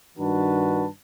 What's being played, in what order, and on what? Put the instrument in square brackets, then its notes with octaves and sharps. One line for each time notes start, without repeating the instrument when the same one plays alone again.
[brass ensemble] G2 D#3 D4 F#4 B4 A5